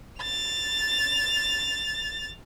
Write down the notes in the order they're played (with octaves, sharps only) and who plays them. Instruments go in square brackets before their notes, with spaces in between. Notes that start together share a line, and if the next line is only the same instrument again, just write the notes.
[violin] A6 F7